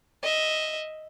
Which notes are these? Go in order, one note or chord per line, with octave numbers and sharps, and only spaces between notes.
D#5 E5